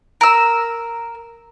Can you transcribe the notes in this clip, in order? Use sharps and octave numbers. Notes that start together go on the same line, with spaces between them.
A#4 E6